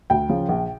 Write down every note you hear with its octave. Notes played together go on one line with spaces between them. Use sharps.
D2 G5
C#3 F3
A#1